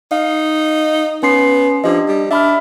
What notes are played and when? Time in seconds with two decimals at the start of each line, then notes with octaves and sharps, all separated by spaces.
0.12 D#4 F5
1.23 B3 C#4 C6 C7
1.84 F3 D4 G4 D#5
2.08 G3
2.31 D4 E5 B5 F6